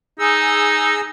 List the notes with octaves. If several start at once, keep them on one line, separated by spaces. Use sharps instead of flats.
D#4 G#4 E6